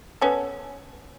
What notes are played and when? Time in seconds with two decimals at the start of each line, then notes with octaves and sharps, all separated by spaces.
0.21 B3 C#4 A4